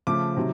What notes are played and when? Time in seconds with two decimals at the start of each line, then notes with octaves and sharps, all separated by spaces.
0.07 C#3 F3 A3 D6
0.37 C3 D#3 F#3